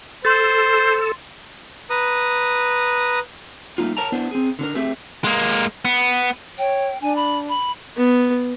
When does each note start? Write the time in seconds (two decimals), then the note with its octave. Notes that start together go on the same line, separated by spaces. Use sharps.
0.25 A4 C5 C6 A6
1.90 B4 A#5 D#6
3.78 G3 A3 A#3 D#4 F4
3.97 A#4 C#5 G5 A5 A#5
4.12 B3 D4 E4 C5
4.31 C4 G#4
4.59 D3 D4 A#4
4.75 A3 C4 G4 G#4 E5
5.24 G#3 A#3
5.85 B3
6.58 C#5 G5
7.02 D4 G#5
7.16 B5
7.49 B5
7.97 B3